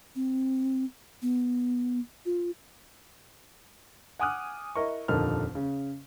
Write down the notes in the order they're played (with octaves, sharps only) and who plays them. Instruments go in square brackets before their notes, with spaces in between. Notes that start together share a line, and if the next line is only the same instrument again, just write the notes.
[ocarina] C4
B3
F4
[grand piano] F#5 G#5 D6 D#6 F6 F#6
E4 A#4 D#5 C#6
D#1 F2 D3 D#4 A#4 F6
C#3